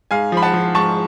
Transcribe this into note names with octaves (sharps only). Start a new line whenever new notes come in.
G#2 F5 G#5
F3 B5
F#5 A5
F3
G#2 A5 C#6